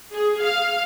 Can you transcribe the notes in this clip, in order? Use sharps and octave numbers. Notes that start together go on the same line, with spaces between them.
G#4
F5